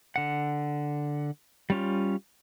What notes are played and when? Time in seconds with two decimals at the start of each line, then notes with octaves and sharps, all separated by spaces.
0.16 D3 F#5
1.70 G3 C#4 F4